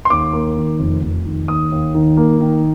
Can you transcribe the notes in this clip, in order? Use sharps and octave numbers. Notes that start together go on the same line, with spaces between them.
C6
D#2 D6
A#3
D#3
F1
F1
D#3
D#2 D#6
D#2
D#3
A#3
D#3